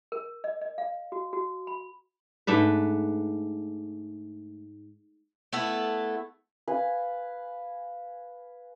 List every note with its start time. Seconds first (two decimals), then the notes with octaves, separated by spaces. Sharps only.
0.12 A#4
0.44 D#5
0.61 D#5
0.78 F5
1.12 F#4
1.33 F#4
1.67 B5
2.47 G#2 A3 D4 B4
5.53 A3 B3 E4 A4
6.68 B4 F5 G#5 B5